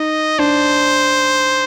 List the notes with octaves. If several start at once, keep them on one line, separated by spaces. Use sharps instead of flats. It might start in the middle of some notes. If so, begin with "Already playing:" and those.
Already playing: D#4 D#5
D4 C5